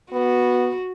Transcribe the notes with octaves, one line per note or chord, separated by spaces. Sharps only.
B3 F#4